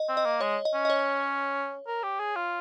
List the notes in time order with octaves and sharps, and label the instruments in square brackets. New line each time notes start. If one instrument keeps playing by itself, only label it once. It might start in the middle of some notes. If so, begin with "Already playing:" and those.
Already playing: [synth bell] D#5
[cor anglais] C4
[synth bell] D#5
[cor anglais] A#3
[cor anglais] G#3 [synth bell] C#5
[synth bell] D#5
[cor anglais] C#4
[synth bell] D#5
C#5
[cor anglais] A#4
G4
G#4
F4